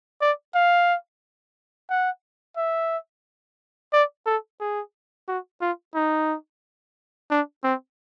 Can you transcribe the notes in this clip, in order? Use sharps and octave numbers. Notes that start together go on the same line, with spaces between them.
D5
F5
F#5
E5
D5
A4
G#4
F#4
F4
D#4
D4
C4